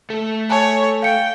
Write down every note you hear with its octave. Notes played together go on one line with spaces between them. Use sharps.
A3 A4
C#5 G#5 A5
F5 G5 C#7